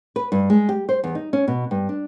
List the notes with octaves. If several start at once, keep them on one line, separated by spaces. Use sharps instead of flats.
B4
G2
G#3
G4
C5
E2
D#4
C#4
B2
G2
D4